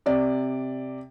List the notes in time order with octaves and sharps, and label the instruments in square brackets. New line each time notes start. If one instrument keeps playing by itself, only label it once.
[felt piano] C3 D5